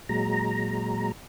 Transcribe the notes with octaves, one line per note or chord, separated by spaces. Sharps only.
A#2 F#3 G#3 A#5